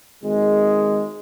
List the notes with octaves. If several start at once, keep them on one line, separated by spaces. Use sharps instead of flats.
G#1 G#3